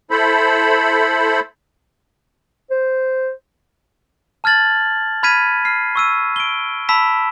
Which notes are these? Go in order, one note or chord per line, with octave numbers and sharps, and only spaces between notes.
E4 A4 C5 B5
C5
A5 F6 G#6 A6 F#7
B5 F6 G#6 B6 D#7
F6 C7
C#6 E6 D#7
D7 G7
A5 B5 E6 B6 E7